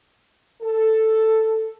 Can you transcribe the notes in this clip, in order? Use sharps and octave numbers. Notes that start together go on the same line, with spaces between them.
A4